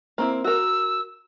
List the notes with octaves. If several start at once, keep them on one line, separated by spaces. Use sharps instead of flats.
A#3 C4 E4
F#4 A#4 E6